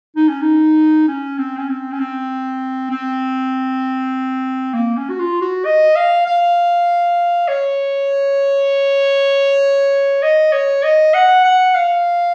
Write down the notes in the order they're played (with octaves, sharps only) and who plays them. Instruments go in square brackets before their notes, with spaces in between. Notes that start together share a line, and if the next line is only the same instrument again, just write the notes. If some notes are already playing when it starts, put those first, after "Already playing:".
[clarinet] D#4
C#4
D#4
C#4
C4
C#4
C4
C#4
C4
C4
A#3
C#4
F#4
F4
F#4
D#5
F5
F5
C#5
D#5
C#5
D#5
F#5
F#5
F5